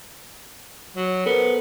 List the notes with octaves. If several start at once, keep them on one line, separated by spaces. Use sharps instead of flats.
F#3
B3 A4 A#4 C5